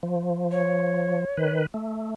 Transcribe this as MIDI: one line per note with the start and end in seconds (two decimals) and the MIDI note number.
0.03 1.25 53
0.51 1.54 73
1.37 1.66 51
1.37 1.66 71
1.74 2.14 57